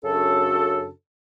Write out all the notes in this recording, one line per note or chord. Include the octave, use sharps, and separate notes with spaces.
F#2 C#3 D4 F#4 A4